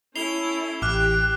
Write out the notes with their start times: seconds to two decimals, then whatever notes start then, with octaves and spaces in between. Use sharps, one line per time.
0.16 C#4 E4 A4 C7 F7 G7
0.82 A1 G4 D6 F6 F#6